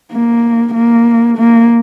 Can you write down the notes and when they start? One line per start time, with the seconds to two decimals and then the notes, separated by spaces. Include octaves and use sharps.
0.12 A#3
0.74 A#3
1.38 A#3